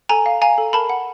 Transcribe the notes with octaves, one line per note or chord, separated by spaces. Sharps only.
A4 G#5 A#5
F5
F5 G#5 A#5
A4
A#4 A5 B5
F#5